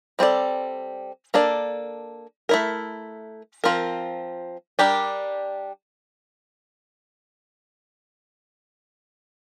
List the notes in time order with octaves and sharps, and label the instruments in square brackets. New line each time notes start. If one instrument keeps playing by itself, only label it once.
[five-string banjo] G3 C4 F4 A4 D5
A#3 D4 A4 D5
A3 E4 A#4
F3 C4 F4 A#4
G3 D4 G4 A#4